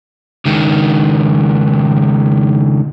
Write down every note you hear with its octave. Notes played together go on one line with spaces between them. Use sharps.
C#2 D#3